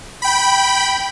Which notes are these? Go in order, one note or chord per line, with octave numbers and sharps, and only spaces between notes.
G5 B5